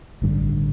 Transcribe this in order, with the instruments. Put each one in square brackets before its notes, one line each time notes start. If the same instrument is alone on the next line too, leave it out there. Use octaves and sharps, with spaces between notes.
[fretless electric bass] A1 G2 D3